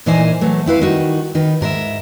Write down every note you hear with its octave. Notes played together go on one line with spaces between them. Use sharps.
A#2 E3 D#4 A#4 C5 G#5
E3 F#3 A3
C4 E4 B4 F5
D#3 G3 D#4 F#4
D#3 D#4 B4
G#2 A#4 B4 E5